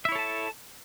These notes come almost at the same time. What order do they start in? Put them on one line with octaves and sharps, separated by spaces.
E5 E4 C#5 A4 A5